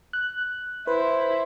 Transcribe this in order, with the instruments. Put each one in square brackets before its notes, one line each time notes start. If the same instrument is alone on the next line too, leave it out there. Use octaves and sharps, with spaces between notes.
[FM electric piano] F#6
[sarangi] E4 [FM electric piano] B4 [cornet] C5